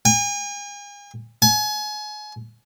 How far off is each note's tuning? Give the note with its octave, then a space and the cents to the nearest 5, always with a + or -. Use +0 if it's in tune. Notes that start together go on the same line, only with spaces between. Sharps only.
G#5 -40
G#5 +30